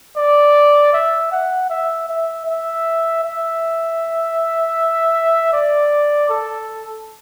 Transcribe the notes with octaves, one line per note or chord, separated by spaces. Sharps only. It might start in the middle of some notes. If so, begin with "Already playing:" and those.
D5
E5
F#5
E5
E5
E5
E5
D5
A4